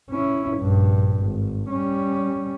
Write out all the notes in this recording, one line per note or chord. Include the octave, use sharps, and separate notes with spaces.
C#4 E4
A#1 G2
G#1
G3 C#4